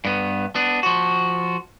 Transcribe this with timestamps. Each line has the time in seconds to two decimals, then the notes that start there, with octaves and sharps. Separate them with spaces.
0.05 G2 B3
0.55 B3 D4
0.83 F3 F#4